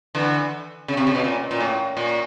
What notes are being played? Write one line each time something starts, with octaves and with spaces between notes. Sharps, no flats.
D3 E3
C#3
C3
C#3
B2
A#2
A#2
A2
A#2